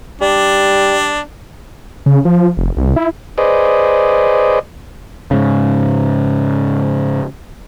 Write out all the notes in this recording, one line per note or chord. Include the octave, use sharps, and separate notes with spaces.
G3 D4
C#3
F3
F1
C2
E4
G#4 B4 C5 D5 D#5
G#2 C#3